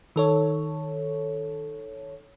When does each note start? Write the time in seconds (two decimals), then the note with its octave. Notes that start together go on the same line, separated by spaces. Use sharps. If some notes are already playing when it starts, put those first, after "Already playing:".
0.16 D#3 A4 C#5